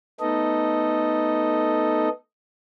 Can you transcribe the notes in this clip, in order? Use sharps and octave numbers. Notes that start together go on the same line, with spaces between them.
A3 B3 D#4 A4 D#5